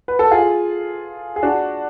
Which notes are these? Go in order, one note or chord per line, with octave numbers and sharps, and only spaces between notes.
B4
A4
F4 G#4
G#4
D4 F#4